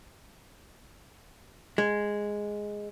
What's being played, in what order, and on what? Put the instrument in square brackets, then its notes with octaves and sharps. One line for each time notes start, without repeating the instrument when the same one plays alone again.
[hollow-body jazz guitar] G#3